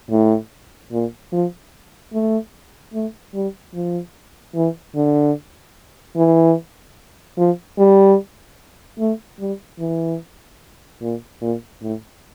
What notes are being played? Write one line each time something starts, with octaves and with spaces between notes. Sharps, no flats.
A2
A#2
F3
A3
A3
G3
F3
E3
D3
E3
F3
G3
A3
G3
E3
A#2
A#2
A2